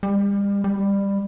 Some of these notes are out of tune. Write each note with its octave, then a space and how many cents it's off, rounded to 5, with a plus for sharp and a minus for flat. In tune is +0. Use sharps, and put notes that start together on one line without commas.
G3 +40
G3 +20